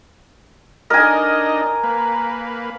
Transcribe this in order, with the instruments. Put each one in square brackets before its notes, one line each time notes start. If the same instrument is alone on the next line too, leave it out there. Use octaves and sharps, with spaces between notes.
[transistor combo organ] D4 D#4 D#5 [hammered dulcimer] A#4 G#5
[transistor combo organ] A#3 B4